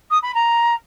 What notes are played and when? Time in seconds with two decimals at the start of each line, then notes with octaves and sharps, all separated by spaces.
0.11 D#6
0.22 B5
0.34 A#5